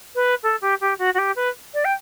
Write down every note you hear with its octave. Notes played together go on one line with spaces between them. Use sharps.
B4
A4
G4
G4
F#4
F#4
G4
B4
D5
G5